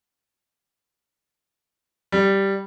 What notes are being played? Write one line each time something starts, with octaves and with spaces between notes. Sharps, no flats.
G3